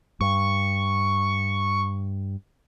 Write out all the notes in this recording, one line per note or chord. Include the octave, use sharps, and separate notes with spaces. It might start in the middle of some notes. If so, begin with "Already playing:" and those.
G2 C#6